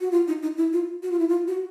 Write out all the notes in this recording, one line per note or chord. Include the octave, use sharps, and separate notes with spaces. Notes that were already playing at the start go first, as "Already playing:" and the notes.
F#4
F4
D#4
D#4
E4
F4
F#4
F4
E4
F4
F#4